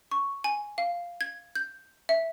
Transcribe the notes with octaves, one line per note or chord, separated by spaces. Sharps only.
C#6
G#5
F5
G#6
G6
E5